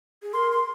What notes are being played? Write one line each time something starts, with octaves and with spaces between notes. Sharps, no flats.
G#4
A#4 C6
C6